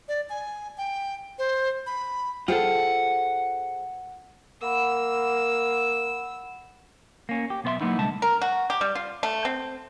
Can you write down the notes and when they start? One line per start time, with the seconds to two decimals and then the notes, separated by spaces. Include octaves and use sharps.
0.08 D5
0.30 G#5
0.78 G5
1.39 C5
1.86 B5
2.48 F4 G#4 A4 C5 F#5 G5
4.62 A#3 F#5 B5 E6
7.29 A#3 C#4
7.50 G4
7.64 B1 B3 C5 E5 C6
7.81 F#3 A#3 B3 D#4 E4
7.99 C2 D3 G#3 A5
8.22 A#4
8.42 F#4
8.70 G4
8.81 G3
8.95 F4
9.23 A3
9.45 C4